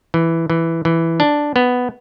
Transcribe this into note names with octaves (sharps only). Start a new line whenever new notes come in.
E3
E3
E3
D4
B3